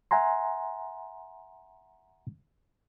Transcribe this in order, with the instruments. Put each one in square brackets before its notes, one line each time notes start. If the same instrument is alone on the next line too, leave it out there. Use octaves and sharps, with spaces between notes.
[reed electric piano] E5 F#5 G#5 A#5 C6